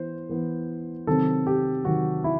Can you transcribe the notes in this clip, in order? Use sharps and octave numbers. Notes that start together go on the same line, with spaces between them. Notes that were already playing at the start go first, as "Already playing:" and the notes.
Already playing: E3 B3 C5
E3 B3
C3 D#3 F#3 C4 A4
G4
C3 D#3 F#3 C4 F#4
E4